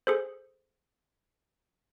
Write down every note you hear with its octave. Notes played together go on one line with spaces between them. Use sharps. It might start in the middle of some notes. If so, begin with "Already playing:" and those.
G#4 A4 C5